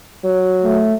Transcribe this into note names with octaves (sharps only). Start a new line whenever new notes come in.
F#3
A3